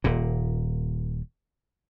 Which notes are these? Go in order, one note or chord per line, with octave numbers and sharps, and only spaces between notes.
D#1 A#2